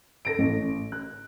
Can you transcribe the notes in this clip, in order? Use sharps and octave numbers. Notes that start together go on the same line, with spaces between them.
A4 A#6 D7
A1
F#6